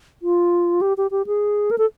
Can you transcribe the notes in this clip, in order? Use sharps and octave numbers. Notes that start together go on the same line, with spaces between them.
F4
G4
G4
G4
G#4
A#4
A4